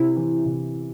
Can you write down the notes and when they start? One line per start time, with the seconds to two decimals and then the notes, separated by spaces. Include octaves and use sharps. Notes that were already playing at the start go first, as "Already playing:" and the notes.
Already playing: C3 E4
0.17 E3
0.45 C3